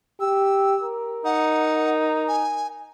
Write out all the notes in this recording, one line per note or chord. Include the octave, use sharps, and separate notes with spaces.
G4 E6
A#4
D#4 F#5
G#5